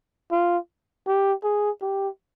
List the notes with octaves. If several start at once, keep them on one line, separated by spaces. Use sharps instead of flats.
F4
G4
G#4
G4